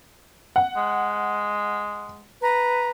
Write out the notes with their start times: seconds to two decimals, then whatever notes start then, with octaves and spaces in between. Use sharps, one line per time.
0.56 F#5
0.76 G#3
2.41 B4 A#5